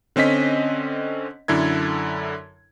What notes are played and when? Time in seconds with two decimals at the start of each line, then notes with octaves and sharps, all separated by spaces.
0.16 D3 C4 C#4 D#5 B6
1.48 F#2 D3 E4 A4 G#6